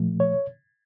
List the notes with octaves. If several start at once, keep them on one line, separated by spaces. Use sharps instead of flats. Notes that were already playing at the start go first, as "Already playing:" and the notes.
Already playing: A#2 F3 A3
C#5